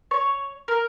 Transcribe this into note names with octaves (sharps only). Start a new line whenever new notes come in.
C#5
A#4